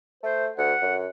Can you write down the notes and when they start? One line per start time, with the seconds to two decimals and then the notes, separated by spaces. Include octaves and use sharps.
0.23 A3 C5
0.58 D2 F#5
0.82 F#2